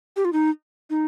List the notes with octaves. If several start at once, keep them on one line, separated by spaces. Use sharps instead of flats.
G4
F4
D#4
D#4